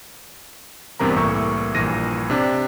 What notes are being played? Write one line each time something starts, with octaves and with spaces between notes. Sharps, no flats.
E2 G2 C3 A#4 A#5
C2 A2 E3 A#3 C#6 E6
A#1 G2 A#2 E3 A#6 D#7
C3 D4 G4